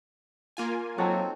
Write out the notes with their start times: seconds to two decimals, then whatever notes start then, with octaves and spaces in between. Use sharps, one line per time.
0.57 A#3 F4 G#5
0.98 F#3 C4 D#4 F#4 A4